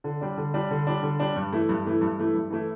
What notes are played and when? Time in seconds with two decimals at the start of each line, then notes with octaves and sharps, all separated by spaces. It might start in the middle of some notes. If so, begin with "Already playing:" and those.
0.04 D3
0.21 G3 D4
0.37 D3
0.54 G3 D4
0.71 D3
0.87 G3 D4
1.03 D3
1.20 G3 D4
1.36 G2
1.52 E3 A3 E4
1.69 G2
1.85 E3 A3 E4
2.01 G2
2.18 E3 A3 E4
2.34 G2
2.50 E3 A3 E4